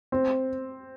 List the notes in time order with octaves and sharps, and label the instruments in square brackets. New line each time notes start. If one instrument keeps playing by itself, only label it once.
[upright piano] C4